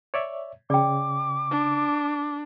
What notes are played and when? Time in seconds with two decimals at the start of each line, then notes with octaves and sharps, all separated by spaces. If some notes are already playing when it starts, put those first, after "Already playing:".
0.14 C#5 D5 E5
0.70 C#3 D5 G5 D6
1.51 D4